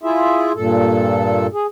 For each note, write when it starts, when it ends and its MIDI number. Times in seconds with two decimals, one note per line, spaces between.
0.03 0.52 64
0.03 0.52 65
0.03 0.52 68
0.03 0.52 76
0.56 1.47 43
0.56 1.47 46
0.56 1.47 69
1.53 1.66 68